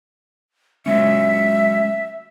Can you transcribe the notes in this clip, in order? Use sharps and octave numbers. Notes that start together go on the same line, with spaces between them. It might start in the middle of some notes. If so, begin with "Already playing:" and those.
F#3 G#3 C#4 E5